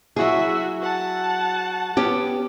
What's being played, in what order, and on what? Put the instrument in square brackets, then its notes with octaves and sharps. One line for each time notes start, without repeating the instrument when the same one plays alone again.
[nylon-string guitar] F#3 E4 G#4 [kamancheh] F#4 E5
[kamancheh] F#5 A5
[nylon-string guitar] B3 C#4 G4